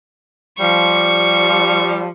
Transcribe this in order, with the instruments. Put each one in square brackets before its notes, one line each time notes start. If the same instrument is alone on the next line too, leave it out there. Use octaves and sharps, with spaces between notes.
[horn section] F3 G3 [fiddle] C#6